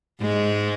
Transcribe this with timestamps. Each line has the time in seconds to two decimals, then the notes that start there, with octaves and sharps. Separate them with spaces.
0.21 G#2 G#3